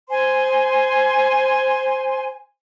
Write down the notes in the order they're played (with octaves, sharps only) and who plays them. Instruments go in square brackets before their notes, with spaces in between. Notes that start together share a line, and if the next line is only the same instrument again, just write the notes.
[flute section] C5 G#5 C6